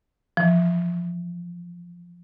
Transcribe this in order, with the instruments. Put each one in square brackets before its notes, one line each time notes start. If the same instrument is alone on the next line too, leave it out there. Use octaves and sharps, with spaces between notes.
[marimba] E3 F3